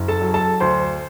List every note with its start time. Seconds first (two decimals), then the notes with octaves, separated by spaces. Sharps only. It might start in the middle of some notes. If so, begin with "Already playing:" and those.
Already playing: F#1
0.08 A4 A5
0.21 F#3
0.34 A4 A5
0.60 D2 C5 C6